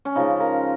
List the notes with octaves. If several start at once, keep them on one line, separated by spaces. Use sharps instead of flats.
C#4
C#3 F3 G#3 D#4
A#4